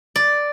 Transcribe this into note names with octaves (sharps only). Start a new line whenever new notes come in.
D5